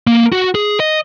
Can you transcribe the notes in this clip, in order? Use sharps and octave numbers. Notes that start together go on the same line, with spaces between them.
A#3
F#4
G#4
D#5